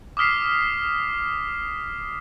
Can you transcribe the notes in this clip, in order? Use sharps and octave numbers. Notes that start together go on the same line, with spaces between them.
D6 D#6 F6 B6 C7